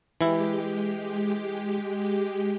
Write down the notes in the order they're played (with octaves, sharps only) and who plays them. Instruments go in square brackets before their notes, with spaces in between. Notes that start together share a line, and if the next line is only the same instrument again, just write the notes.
[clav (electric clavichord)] E3 E4 [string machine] G#3 G4